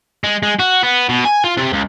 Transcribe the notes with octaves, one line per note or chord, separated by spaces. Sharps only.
G#3
G#3
F#4
B3
B2
G#5
F4
C3
C#2